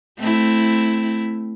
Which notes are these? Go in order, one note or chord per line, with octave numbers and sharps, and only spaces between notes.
A3 C4 E4